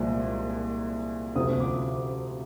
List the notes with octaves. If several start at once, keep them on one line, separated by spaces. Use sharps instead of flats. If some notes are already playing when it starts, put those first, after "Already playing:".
Already playing: C2 A#2 F3 G#3
D2 C3 F3 D#6
D6